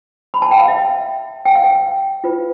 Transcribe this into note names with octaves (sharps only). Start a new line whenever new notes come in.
B5
A5
G5
F5
E5
G5
F5
G5
F4 B4